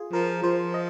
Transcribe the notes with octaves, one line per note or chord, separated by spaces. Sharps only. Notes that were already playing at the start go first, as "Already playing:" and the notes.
Already playing: F4 G#4
F3 A#4
F3 C5
D#5